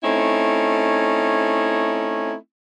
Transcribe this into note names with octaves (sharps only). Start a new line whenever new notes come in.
A3 C4 C#4 D#4 E4